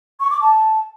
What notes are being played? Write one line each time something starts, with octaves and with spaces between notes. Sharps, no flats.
C#6
D6
A5